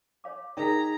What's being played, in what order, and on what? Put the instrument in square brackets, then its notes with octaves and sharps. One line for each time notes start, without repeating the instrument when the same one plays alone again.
[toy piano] C#5 F5 D6
[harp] D#4 G#4 B6 [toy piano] A#4 C#5 G5 [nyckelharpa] A#5